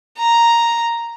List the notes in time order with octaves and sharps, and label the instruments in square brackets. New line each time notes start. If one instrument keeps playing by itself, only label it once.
[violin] A#5